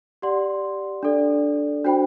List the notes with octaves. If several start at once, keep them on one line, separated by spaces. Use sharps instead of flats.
G4 D5 F#5 C6
D4 A4 D5
D4 F#4 C5 G5 B5